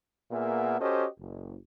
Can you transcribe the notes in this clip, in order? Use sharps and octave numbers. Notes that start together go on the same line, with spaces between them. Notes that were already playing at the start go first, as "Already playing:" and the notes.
A#2 A#3 B3 G#4 E5 F#5
C#4 F#4 G4 A4 C5 D#5
F#1